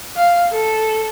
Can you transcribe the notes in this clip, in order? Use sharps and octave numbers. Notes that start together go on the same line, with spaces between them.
F5
A4